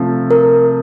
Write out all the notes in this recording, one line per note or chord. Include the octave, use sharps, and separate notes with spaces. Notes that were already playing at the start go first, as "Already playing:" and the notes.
Already playing: C3 F3 A3
A#4